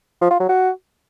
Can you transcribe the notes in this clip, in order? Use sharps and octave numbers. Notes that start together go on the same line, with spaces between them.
F3
F4
F#3
F#4